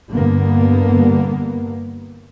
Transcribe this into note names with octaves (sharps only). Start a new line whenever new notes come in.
G2 D3 A#3 B3